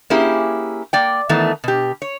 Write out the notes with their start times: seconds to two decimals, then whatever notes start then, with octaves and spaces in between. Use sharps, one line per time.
0.10 A#3 C#4 E4 G4 G#4
0.93 A#3 D5 G5
1.29 D#3 E3 A3 B3
1.64 B2 G4
2.02 C#5